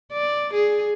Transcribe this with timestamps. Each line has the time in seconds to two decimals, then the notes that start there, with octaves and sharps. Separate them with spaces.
0.12 D5
0.53 G#4